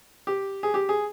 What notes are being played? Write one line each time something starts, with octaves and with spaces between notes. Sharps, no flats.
G4
G#4
G4
G#4